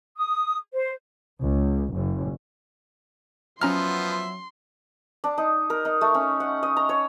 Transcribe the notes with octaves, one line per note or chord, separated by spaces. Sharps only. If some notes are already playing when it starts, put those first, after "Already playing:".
D#6
C5
C#2
F#1
F3 F#3 B3 C#4 E5 A#5 C6 F6
D4
D#4
A#4
D#4
A3
C#4
F#5
D#5
A#5
C#5